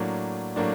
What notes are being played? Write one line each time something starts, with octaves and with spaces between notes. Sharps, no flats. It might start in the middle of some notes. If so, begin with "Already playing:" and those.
Already playing: A2 F#3 A#3 D4
A2 F#3 A#3 D4